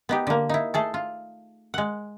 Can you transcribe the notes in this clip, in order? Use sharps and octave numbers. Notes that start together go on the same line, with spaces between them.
B3 D#4 G4
D3 A#3
D#4 E4
A3 G#4 A4
F4
G#3 F#5